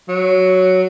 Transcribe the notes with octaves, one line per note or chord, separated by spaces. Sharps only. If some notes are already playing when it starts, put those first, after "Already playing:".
F#3